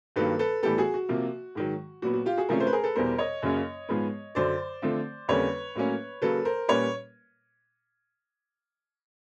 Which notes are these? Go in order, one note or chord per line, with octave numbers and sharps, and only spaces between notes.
G2 D#3 F#3 A#3 A4 B4
A4 B4
A2 E3 G3 B3 G4 A4
F#4 G#4
F#4
C3 F3 A#3
G#2 D#3 F#3
A#2 F#3 B3 F#4
F#4
F4 G4
F#4 G#4
C3 F3 A3 C#4 G#4 A#4
A#4 C5
B4
G#4 A#4
A4 B4
E2 B2 G3 A#4 C5
C#5 D#5
F#2 C#3 F#3 A#3 C#4
G#2 F3 G#3 B3
F#2 D3 F#3 C5 D5
D3 F3 A3 C4
F2 D3 G3 A#3 C#4 B4 C#5
A2 F#3 A#3 C#4
C#3 F#3 A#3 A4 B4
A#4 C5
A#2 G3 A#3 C#4 B4 C#5